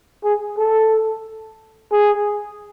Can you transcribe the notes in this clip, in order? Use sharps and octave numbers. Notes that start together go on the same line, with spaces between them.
G#4
A4
G#4